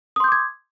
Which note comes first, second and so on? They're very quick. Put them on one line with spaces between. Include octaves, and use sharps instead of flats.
D#6 C6 G6 D6 G#6